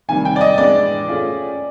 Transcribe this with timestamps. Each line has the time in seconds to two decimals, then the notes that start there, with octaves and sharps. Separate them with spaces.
0.08 C3 D#3 G3 G#5
0.25 G5
0.36 D5
0.41 D#5
0.58 A2 E3 G#3 B3 D4 D5
1.08 A3 C#4 F4 G#4